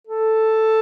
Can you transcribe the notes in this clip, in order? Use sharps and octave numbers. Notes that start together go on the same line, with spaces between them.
A4